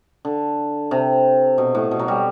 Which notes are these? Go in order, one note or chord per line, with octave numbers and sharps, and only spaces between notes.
D3
C3
B2
A2
B2
F#3
G3